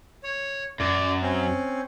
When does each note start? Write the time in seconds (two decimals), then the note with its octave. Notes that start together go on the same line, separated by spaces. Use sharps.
0.23 C#5
0.80 F#2 D5
1.22 C4 C#4